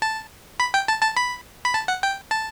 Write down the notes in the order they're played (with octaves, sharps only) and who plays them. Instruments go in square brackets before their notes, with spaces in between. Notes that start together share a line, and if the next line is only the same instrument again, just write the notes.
[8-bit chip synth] A5
B5
G5
A5
A5
B5
B5
A5
F#5
G5
A5